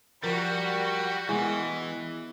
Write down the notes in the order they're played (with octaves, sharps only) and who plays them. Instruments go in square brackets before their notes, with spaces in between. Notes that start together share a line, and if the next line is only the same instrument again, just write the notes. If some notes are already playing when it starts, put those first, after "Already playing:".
[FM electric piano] F3 A#4 [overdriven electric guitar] G3 [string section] F#4
[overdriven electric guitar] E3 [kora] G#3 B3 [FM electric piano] E4